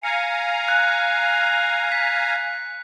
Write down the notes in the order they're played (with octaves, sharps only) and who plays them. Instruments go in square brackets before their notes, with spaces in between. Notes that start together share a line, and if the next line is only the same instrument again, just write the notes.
[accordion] F5 G#5 A#5 [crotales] C#7
[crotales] F#6
B6